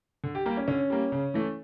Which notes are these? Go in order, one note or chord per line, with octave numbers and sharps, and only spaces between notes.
D3
G4
G3 A#3 G4
C#4
D3 C#4
G3 A#3
C#3
E3 A3